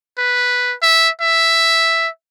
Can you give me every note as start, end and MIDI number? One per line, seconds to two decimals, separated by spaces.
0.18 0.74 71
0.82 1.09 76
1.21 2.08 76